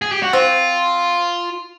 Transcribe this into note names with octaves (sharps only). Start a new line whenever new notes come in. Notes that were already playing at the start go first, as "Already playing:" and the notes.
G#4
G4
F#4
C4 F4